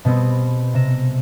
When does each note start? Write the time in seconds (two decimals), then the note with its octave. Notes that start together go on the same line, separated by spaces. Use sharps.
0.05 B2 G3 B3 C4
0.74 C3 A#6 E7